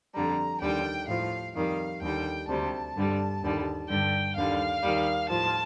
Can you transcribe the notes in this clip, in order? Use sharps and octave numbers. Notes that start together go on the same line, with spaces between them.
F2 D3 G3 A#5
D#2 D3 G3 G5
A2 F3 F5
F2 D#3 G3 F5
D#2 D3 G3 G5
D2 C3 G3 A5
G2 D3 G3
D#2 D3 G3
G2 D3 G3 G5
D#2 D3 G3 F5
D#2 D#3 G3
A2 F3 A5